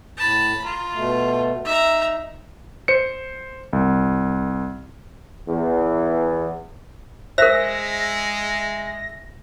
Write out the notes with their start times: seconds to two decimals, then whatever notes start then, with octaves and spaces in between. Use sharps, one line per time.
0.17 A2 A5 B5
0.65 F4 A#5
0.94 B2 A3
1.65 D#4 E5 A#5
2.88 C5 C#7
3.73 C2
5.48 E2
7.38 G#3 A#4 C5 E5 A#6